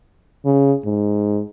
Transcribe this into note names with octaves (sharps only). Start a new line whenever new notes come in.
C#3
G#2